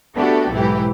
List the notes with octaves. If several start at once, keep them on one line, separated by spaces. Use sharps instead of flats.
A3 B3 D4 F#4 G4 A4
B1 G#2 E3 E4 G4